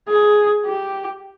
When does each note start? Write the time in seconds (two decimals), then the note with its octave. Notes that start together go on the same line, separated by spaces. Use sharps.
0.08 G#4
0.66 G4